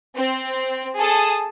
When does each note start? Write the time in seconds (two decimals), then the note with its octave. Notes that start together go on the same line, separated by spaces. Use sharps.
0.14 C4
0.97 G#4 A4 A5 D#6